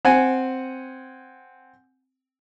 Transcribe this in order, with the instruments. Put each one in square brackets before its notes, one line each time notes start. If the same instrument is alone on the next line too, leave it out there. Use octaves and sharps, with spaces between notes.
[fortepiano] C4 F#5 G#5